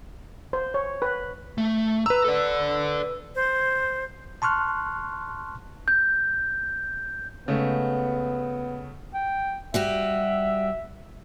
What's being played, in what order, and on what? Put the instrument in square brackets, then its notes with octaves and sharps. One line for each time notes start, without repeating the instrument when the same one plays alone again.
[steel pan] C5
C#5
B4
[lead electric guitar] A3
[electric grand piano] B4 E6 [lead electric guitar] A#5
[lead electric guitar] A4 D5
[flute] C5
[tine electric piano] A5 C6 C#6 F6 F#6
[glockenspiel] G6
[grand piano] C#3 G#3 A3 [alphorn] B3
[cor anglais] G5
[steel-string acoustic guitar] G3 F#4 G4 [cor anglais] E5